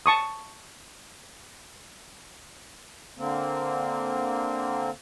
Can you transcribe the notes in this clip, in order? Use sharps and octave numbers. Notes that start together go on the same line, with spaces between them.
A5 C#6 D#6
D3 A#3 C4